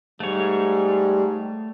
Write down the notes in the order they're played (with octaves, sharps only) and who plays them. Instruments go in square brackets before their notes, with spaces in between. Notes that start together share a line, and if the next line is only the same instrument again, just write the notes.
[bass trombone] G#2 [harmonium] G3 [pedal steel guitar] A3 C#5